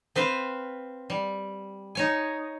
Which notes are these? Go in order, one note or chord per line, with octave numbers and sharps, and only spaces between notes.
C4 B4 C5 F5
G3
D#4 C#5 G#5